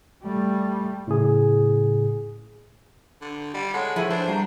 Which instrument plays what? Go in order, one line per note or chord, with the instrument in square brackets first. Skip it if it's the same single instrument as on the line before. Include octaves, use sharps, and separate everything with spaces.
[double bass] G3 A3
[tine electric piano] A2 C#3 G#4
[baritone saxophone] D3
[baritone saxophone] G3 [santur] F#5 C6
[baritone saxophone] G#3 [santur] A4 [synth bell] C#5 [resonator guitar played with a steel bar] F#5
[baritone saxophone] A2 [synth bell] F3 C5 F#5 [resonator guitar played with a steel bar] E4 G#4 [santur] B4
[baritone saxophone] D4 [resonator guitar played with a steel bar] C5 [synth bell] A5
[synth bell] G3 [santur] F#4 G5 A#5